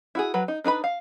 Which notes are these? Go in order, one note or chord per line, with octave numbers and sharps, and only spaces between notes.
E4 F#4 G#4
F#3 B4
D#4
D4 D#4 B4 B5
F5